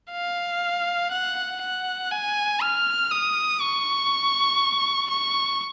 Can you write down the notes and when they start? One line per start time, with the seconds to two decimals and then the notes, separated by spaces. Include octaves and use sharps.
0.12 F5
1.12 F#5
1.62 F#5
2.11 G#5
2.62 F6
3.11 D#6
3.61 C#6
5.10 C#6